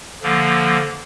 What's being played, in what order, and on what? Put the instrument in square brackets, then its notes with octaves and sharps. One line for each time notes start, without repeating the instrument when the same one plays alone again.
[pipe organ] D3 F3 A#3